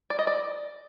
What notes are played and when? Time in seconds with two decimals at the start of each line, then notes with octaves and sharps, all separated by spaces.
0.10 D5
0.19 D#5
0.27 D5